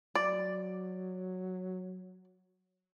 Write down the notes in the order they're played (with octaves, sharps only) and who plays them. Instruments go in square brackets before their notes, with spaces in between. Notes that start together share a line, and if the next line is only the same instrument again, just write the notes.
[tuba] F#3 [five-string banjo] D5